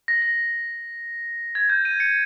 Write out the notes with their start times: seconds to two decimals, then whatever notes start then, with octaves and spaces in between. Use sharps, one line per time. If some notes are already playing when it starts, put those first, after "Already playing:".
0.08 A#6
0.22 A#6
1.55 G#6
1.69 G6
1.85 D#7
2.00 C#7